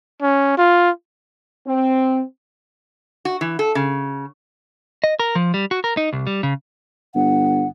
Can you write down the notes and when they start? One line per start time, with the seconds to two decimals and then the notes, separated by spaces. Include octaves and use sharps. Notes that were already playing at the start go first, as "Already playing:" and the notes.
0.22 C#4
0.58 F4
1.66 C4
3.25 F#4
3.41 E3
3.59 A4
3.75 C#3
5.04 D#5
5.20 A#4
5.35 F3
5.54 G3
5.71 F#4
5.84 A#4
5.97 D#4
6.13 C2
6.27 G3
6.43 C#3
7.15 G1 F#5